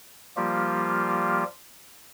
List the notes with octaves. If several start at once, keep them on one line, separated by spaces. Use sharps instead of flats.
F3 G3 A#3 F4 G4